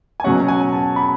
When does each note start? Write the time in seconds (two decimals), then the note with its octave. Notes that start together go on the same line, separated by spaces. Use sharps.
0.20 G#5
0.24 B2 F#3 C#4 F#5
0.48 G#5
0.72 A5
0.96 B5